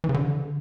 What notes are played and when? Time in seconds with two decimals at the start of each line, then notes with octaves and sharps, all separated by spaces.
0.04 E3
0.09 C#3
0.14 D3